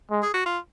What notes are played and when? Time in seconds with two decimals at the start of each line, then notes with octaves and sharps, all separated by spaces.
0.11 G#3
0.23 G#4
0.34 F#4
0.46 F4